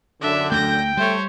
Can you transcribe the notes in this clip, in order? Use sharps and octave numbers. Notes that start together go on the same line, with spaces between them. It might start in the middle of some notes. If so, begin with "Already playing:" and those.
F#2 D3 D4 E5
D2 A3 G5 G6 A#6
G3 A3 C5 C#5